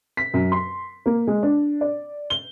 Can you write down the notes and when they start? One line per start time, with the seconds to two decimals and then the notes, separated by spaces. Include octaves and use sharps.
0.17 B6
0.34 F#2
0.52 C6
1.06 A#3
1.27 G#3
1.43 D4
1.81 D5
2.30 G7